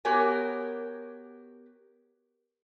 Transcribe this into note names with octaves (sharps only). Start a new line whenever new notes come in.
B3 F#4 G4 A#4 C#5 G#5